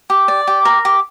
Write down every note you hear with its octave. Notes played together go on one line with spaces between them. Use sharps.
G4
D5
G4
A#4
G4